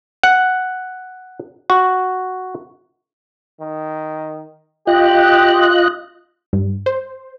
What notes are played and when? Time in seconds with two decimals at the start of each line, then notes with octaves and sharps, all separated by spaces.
0.23 F#5
1.70 F#4
3.60 D#3
4.87 F4 G4 D#5 F#6
6.53 G2
6.86 C5